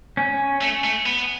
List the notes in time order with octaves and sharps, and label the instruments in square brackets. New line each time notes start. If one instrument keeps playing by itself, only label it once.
[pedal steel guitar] C#4
[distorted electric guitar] A3
A3
B3